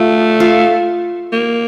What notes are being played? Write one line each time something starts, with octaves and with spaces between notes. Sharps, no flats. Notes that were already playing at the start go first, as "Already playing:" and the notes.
Already playing: A3 F4
F4
A#3